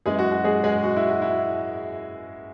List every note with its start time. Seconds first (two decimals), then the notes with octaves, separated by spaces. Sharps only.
0.06 F#2 E3 G#3 G#4
0.19 F#4
0.32 F#4
0.44 G#3 G#4
0.64 G#3 G#4
0.84 F#4
0.96 E4
1.09 F#4
1.22 E4